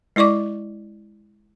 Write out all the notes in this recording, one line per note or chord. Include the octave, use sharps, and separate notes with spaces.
G#3 E4 D5 C#6 D6